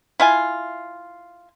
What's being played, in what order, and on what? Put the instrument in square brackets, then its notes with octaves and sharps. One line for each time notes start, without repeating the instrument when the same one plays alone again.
[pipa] E4 F4 G#5